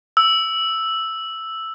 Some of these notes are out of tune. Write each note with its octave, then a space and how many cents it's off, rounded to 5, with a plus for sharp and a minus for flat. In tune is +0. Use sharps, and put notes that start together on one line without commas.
E6 +0